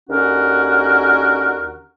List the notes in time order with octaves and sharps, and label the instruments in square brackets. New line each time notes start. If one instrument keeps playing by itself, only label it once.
[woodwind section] D#2 D3 C#4 F#4 A#4